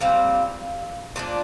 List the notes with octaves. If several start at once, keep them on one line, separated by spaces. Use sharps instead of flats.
A#2 G3 C4 F5
A#2 F3 D4